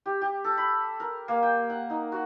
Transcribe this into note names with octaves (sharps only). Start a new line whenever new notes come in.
G4
G4
A4
B5
A#4
A#3
G5
F#5
D#4
F#4